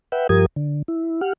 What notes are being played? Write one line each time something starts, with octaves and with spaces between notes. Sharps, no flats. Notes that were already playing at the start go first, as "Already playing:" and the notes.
B4 E5 F#5 G5
G2 F3 G4 A#4 D#6 G#6
D3
E4
G4 F#5 F6